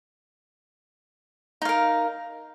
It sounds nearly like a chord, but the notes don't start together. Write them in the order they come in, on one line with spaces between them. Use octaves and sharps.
D#4 F5 A#4